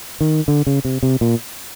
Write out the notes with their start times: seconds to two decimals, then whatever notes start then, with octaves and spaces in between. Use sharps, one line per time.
0.21 D#3
0.48 D3
0.67 C#3
0.85 C3
1.03 C3
1.21 A#2